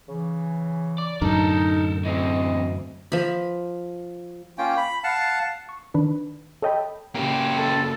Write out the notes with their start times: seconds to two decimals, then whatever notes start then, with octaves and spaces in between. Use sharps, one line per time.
0.08 C#3 E3
0.98 D5
1.22 F#2 A2 D3 D#4 A4 A#4
2.05 D2 E3 C4 D#5
3.12 F3 B5
4.58 A#3 C#4 F4 G5
4.77 B5
5.04 F5 F#5 A5
5.69 C#6
5.94 D#3 D4 B4
6.62 A4 C#5 D#5 G5 A5 B5
7.15 C#3 A#3 C#4 G4
7.56 A4